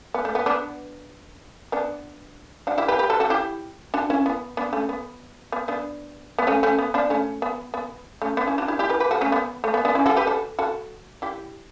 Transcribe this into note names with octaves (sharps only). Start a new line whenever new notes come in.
B3
A3
B3
B3 D4
B3 D4
D4 F#4
E4 G4
G4 B4
G4 B4
F#4 A4
F#4 A4
E4 G4
D4 F#4
C#4 E4
B3
B3 D4
A3 C#4
B3
B3
B3 D4
B3
A3 C#4
A3 C#4
B3
B3 D4
A3 C#4
B3
B3
A3 C#4
B3 D4
C#4 E4
D4 F#4
E4 G4
E4 G4
G4 B4
G4 B4
F#4 A4
A3 C#4
B3
A3
B3
B3 D4
C#4 E4
F#4 A4
G4 B4
F#4 A4
F#4 A4
E4 G4